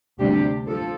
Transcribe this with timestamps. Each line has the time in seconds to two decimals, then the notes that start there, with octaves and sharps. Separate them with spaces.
0.19 D2 C3 G3 D4 G4
0.67 F3 A4